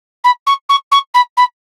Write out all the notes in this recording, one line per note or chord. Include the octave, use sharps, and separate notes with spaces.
B5
C#6
C#6
C#6
B5
B5